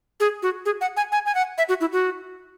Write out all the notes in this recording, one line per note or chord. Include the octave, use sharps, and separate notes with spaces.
G#4
F#4
G#4
F#5
G#5
G#5
G#5
F#5
E5
F#4
E4
F#4